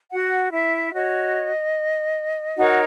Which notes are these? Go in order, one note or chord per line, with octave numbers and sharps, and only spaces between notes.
F#4 F#5
E4 E5
F#4 C#5 D#5
D#4 F#4 A#4 C#5 F#5